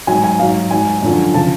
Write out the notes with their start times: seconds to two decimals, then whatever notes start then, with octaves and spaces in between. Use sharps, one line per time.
0.07 G#2 F#3 G#5
0.24 G#5
0.39 G#2 F#3 F5
0.71 G#2 F#3 G#5
1.03 F#2 D3 F3
1.34 C#3 F3 A5